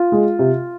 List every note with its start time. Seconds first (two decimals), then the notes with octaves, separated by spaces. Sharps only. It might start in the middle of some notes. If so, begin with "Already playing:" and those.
Already playing: F4
0.12 G#3
0.39 C3